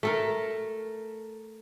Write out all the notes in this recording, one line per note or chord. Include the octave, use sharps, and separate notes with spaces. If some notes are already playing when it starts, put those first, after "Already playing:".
A3 A4 A#4